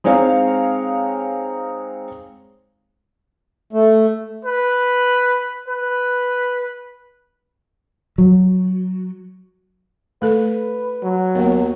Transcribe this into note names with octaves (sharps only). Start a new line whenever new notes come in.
G#3 C4 D#4 C#5 F5
A3
B4
B4
F#3
A3 A4 B4
F#3
D#2 A#3 B3